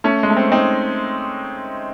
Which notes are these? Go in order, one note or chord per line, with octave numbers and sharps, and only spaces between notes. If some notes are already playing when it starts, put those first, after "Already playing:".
A3 C#4
G#3
A3
C4
C#4
C4 D#4